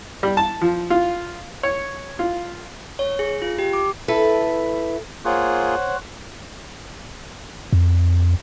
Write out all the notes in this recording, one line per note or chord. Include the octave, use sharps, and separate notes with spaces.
G3
A5
F3
F4
C#5
F4
C#5
G#4
F4
G4
D6
E4 A4 B4
A#3 F4 G#4 C5 C#5 F#5
F2